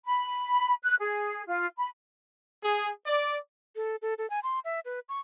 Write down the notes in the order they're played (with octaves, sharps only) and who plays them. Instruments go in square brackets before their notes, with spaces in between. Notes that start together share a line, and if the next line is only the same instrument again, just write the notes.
[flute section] B5
F#6
G#4
F4
B5
[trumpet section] G#4
D5
[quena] A4
A4
A4
G#5
C6
E5
B4
C#6